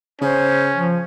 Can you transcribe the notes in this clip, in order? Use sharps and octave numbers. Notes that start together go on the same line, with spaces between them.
C#3 C#4 C5
F3